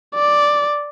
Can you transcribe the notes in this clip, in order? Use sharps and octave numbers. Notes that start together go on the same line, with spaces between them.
D5